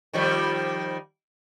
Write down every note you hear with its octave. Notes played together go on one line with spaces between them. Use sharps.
D#3 F3 G3